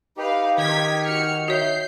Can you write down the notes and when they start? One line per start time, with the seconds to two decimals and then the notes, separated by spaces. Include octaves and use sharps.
0.17 D#4 G4 B4 F5
0.58 D#3 G#6 B6
1.04 F#4 F6 C#7
1.48 F#4 C#5 E5 G6 C7